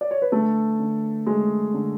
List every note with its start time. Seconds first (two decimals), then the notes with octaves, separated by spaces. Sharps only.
0.01 D5
0.11 C#5
0.22 B4
0.32 D3 A3 A4
0.79 D3
1.26 G#3 A3 G#4
1.74 D3